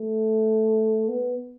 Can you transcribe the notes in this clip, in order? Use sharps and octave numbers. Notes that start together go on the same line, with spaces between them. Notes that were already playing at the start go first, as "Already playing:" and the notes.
Already playing: A3
B3